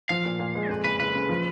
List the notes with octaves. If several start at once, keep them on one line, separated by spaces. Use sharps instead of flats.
F3 F5
A#2
A#2
G#3
F2 B4
F#1 B4
F#1 B4
C#3
F3